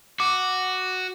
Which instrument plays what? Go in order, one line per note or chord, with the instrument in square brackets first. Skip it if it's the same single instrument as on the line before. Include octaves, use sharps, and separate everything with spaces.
[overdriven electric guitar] F#4 [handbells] D6